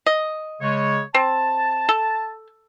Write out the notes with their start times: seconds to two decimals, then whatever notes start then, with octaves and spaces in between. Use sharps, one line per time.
0.06 D#5
0.61 C#3 G#3 C#5
1.15 C4 A5
1.89 A4